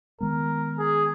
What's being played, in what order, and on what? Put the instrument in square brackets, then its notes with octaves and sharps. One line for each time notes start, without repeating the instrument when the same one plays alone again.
[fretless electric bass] D#3 G#3 B3 [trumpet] A#4
[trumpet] G#4